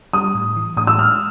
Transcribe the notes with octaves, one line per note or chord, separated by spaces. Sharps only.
G3 D#6
A2
E3
A2 D#6
E6
G#3 F6